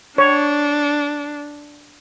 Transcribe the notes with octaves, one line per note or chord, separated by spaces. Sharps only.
D4 C#5